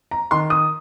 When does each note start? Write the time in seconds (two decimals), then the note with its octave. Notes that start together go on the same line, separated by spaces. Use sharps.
0.11 A#5
0.31 D#3 C6
0.50 D#6